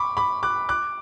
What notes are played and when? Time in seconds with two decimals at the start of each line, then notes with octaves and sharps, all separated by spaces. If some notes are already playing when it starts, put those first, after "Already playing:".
Already playing: B5 C#6 D6
0.17 B5 D6
0.43 D6 F#6
0.69 D6 F#6